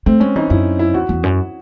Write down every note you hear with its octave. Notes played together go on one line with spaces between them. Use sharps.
A3 C4
G#3 C#4
E3 D#4
F#2 E4
E4
E2 F#4
E2
F#2